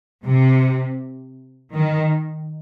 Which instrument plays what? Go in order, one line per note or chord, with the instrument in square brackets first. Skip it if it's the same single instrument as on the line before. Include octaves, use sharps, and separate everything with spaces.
[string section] C3
D#3